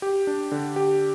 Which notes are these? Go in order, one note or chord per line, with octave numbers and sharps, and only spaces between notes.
G4
D4
D3
G4